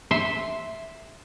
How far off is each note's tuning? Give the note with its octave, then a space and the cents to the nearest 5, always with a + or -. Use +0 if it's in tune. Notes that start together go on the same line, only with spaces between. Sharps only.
E5 -5 C6 +0